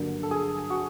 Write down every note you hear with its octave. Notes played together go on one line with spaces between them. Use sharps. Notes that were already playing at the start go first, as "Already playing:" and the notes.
Already playing: G2 D3 F#3 A#3
A4
G#4
F#4